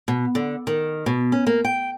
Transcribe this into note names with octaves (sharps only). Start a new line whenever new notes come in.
B2
D3
D#3
B2
C#4
A#3
G5